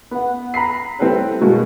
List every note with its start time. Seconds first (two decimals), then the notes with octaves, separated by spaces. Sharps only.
0.11 B3 F#5
0.54 A#5 B5 B6 C7
0.99 G3 C4 E4 A4 B4 C#5
1.41 B2 G#3 A#3